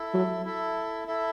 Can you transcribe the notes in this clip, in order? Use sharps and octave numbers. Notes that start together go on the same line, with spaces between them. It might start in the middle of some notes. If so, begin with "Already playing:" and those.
Already playing: E4 A4 E5
F#3
E4 A4 E5
E4 A4 E5